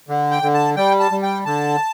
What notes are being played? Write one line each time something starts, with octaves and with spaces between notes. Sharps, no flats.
D3
G5
D3
A5
G3 G5
A5
G3
G5
D3 A5